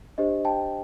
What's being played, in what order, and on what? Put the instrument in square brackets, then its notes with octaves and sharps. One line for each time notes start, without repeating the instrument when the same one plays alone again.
[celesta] D4 G4 C5 D#5
G5 A5